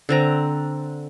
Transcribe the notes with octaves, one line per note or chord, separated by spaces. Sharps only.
D3 C4 A#5